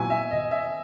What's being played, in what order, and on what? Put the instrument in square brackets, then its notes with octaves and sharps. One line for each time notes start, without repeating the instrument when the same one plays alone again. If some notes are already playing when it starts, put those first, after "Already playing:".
Already playing: [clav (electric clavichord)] A#2 F#3 B3 E4 [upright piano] G#5
[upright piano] E5
D#5
E5